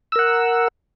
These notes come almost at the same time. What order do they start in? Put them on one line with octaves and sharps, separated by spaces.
E6 A#4 F#5